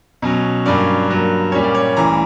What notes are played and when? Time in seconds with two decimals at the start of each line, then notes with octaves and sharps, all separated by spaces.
0.22 B2 F#3 C#4
0.65 G2 F#3 A#3 C#4 D5
1.10 G2 F#3 A#3
1.52 A#2 G3 A#3 C#4 C#5
1.63 D5
1.75 C#5
1.96 D2 C#3 E3 G3 A#5